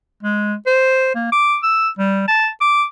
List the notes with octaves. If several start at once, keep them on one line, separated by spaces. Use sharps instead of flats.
G#3
C5
A#3
D6
E6
G3
A5
D6